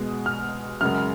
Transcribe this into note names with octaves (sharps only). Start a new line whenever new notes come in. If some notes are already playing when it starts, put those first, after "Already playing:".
Already playing: B2 G#3
F6
F#2 C#3 G#3 F6